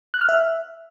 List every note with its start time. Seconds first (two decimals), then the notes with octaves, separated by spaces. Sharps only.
0.14 F#6
0.21 F6
0.29 E5